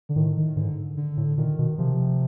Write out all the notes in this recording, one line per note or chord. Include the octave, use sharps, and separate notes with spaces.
D3
A2 D#3
D#3
G#2 D3
D3
A2
A#2 D#3
B2
C3 F3